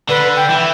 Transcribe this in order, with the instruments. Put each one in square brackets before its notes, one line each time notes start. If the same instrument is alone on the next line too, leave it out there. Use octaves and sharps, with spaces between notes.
[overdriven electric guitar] D3 [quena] B4
[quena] G5
[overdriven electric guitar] E3